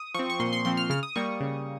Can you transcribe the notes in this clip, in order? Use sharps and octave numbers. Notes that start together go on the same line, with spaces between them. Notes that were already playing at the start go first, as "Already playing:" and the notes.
Already playing: D#6
F3 C4 C#6
C#6
A#2 C6
C6
F3 C4 C6
F6
C#3 F6
D#6
G3 A#3 C#6
C#3